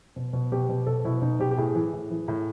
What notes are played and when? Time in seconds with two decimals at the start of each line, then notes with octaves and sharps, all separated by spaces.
0.16 B2
0.33 B2
0.52 B2 G4
0.69 B2
0.86 B2 A4
1.05 B2 E4
1.22 B2 D#4
1.40 B2 G4
1.51 G4
1.58 A2 G#4
1.75 E3
1.93 A2
2.10 E3
2.28 A2